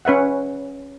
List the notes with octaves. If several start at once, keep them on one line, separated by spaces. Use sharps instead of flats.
C#4 B4 E5 F#5